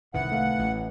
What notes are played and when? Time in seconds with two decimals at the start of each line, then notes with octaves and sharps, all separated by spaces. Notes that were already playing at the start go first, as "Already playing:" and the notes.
0.14 C2 G#2 D#3 E3 F#5
0.32 A3 F5
0.59 A1